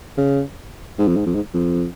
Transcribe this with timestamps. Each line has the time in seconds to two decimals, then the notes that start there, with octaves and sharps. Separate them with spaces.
0.17 C#3
0.99 G#2
1.08 F2
1.17 G#2
1.26 F2
1.35 G#2
1.54 F2